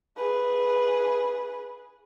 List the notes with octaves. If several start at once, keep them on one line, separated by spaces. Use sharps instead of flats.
G#4 B4